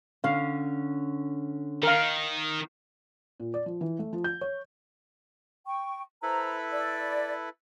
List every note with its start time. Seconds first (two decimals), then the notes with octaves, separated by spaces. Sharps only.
0.24 D3 C#4 F5
1.83 D#3 A#4 F5
3.40 A#2
3.54 D5
3.66 F3
3.81 E3
3.99 A3
4.13 F3
4.24 G6
4.41 C#5
5.66 G5 C#6
6.23 E4 A4 B4 C5 A#5
6.72 D5